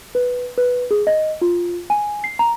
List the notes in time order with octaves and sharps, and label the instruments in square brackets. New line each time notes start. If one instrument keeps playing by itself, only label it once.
[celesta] B4
B4
G#4
D#5
F4
G#5
C7
A#5